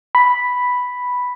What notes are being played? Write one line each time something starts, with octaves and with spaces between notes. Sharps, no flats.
B5